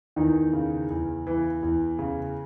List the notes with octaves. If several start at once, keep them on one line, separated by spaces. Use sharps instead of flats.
E2 D#3 D#4
C#3
E2
E3
E2
C#3